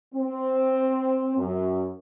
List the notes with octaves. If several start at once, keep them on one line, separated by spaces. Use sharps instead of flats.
C4
F#2